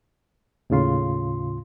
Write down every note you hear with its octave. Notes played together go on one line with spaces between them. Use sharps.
D#2 A2 C#3 F4 C6